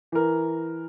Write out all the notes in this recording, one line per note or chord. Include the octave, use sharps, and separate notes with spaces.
E3 A#4